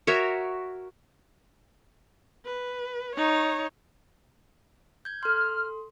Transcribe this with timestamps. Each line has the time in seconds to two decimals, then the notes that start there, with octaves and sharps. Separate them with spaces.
0.07 F#4 A#4 C#5 E5
2.46 B4
3.16 D#4 C#5
5.05 G6 G#6
5.23 A4 C6 F6